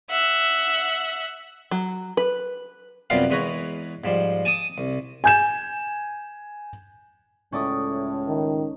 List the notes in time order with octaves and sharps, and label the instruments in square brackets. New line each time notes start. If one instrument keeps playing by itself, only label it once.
[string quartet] E5 F#5
[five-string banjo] F#3
B4
[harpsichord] F#2 C3 G3 B3 F4 F5
E2 G#3 B4 C#5 A#5
G#2 F3 G3
G#5 A5 D6 D#6
C2
[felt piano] G#5 G6 E7
[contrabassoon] C#2 [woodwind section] A2 [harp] C#4 D5 D#6
[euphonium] D#3